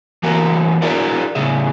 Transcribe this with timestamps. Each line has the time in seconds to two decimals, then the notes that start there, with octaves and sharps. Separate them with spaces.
0.23 E3 A3 A#3 F#4 A#4
0.82 D4 E4 F#4 G#4 A#4 D5
1.35 A2 C#3 G#4 E5